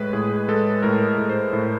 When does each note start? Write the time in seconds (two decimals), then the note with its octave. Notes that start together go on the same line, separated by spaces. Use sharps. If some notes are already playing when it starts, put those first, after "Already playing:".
Already playing: A2 G#3 B4
0.13 A2 G#4
0.48 G#3 A4
0.82 A2 A#4
1.18 A2
1.29 C5
1.53 A2